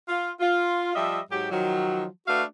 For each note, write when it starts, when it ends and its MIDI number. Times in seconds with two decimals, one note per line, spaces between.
0.09 0.31 65
0.40 0.95 65
0.96 1.20 53
0.96 1.20 55
0.96 1.20 75
0.96 1.20 76
1.31 1.50 44
1.31 1.50 54
1.31 1.50 67
1.51 2.06 51
1.51 2.06 53
1.51 2.06 54
2.27 2.43 57
2.27 2.43 62
2.27 2.43 66
2.27 2.43 71
2.27 2.43 77